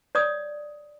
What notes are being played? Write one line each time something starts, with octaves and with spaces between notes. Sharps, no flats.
C#5 D5 D#6